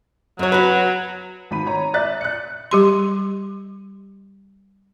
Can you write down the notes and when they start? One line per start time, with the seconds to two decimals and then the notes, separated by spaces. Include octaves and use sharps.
0.39 F#2 F#3 C#5
0.52 F#4 B4
1.51 G#1 B5 D#7
1.66 C#5 A#5
1.94 D5 E5 F#6 A6
2.21 F#6 C#7
2.71 G3 G4 C6